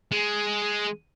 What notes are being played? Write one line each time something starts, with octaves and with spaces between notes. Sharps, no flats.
G#3